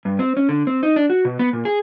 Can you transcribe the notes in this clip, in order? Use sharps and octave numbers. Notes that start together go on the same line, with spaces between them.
G2
C4
C#4
D3
C4
D#4
D4
F#4
B2
B3
A#2
G#4